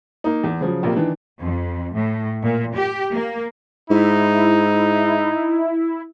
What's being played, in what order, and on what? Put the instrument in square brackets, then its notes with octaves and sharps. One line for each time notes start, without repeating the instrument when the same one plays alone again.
[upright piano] A#3 D#4
E2
C#3 F3 F#3
A#1 C3 A#3
D#3 E3 D4
[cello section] F2
A2
A#2
G4
A#3
[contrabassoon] G#2 [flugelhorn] D#4 [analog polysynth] E4